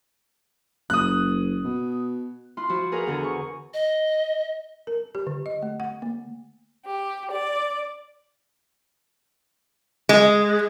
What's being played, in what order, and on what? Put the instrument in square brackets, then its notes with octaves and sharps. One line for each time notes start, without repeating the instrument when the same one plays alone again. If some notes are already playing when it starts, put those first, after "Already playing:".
[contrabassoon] F#1 [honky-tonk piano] D#6 F#6
[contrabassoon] B2
[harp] E4 F4 C6 F#6
F3 E4 F#4
G#4 A#4 B4 C#5 F5 F#5
E2 D3 G#4
C#6
[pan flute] D#5
[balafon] A#4
G4
D3
D#5
A3
F#5
A#3
[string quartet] G4
D5
[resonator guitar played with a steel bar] G#3